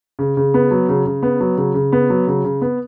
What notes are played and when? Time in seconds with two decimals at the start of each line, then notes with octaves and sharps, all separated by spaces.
0.19 C#3
0.37 C#3
0.54 B3
0.71 F#3
0.89 C#3
1.06 C#3
1.23 B3
1.40 F#3
1.57 C#3
1.74 C#3
1.92 B3
2.10 F#3
2.27 C#3
2.44 C#3
2.62 B3